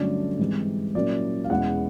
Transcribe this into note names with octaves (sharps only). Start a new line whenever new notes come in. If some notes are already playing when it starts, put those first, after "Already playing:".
Already playing: G2 D3 F#3 A3 C#4 D5
G#2 E3 G3 C4
A#2 F#3 A#3 C#4 E4 D5
F5
E2 B2 G#3 C#4 E4 F#5